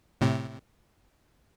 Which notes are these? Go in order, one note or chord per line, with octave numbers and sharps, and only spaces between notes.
A2 C3